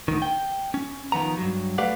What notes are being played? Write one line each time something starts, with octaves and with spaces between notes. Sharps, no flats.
D2 D#3
G5
C#4
D#3 F3 B3 A#5
G2 F#3
A3 G4 B4 D5 F5 F#5